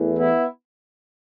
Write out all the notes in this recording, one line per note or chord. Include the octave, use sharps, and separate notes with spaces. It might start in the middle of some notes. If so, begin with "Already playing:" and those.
Already playing: E2 E3 A3
B3 E4